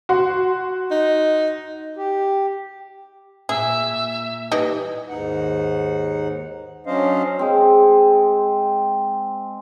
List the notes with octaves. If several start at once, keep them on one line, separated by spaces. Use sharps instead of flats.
F#4 C6
D#4
G4
A#2 G#4 E5
E3 G3 D#4 D#5
D#2 G#2 D#4 F#5
F#3 C#4 D4 C5 D#5 F5
G#3 C4